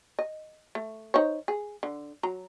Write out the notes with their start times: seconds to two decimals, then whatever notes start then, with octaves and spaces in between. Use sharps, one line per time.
0.19 D#5
0.75 A3
1.14 D#4 C5 C#5
1.48 G#4
1.83 D3
2.23 F#3 A#5